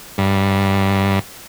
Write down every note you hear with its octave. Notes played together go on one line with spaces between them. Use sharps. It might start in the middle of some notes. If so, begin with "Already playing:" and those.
G2